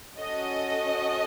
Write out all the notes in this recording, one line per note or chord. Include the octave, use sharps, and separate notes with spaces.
C#4 F#4 A4 D#5